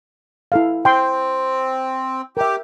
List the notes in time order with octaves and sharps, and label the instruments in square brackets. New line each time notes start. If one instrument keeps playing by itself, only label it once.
[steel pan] E4 A4 F5
[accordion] C4 [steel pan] G5 C6
[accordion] G4 [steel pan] A#4 E5